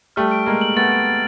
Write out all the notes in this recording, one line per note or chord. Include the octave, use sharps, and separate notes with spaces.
G3 A3 F6
D7
G#3 A#3 F6
F#7
A3 B3 A6
D7
A6